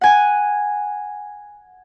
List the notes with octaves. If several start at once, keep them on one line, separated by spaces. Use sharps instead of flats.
F#5 G#5